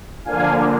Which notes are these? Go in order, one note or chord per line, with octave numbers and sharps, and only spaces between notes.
D3 F3 A#3 D4 F5 G#5